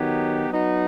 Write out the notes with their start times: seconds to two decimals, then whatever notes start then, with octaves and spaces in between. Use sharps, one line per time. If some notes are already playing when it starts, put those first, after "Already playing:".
Already playing: D#3 F#3 B3 D#4 G4
0.50 F#3 B3 D#4 F#4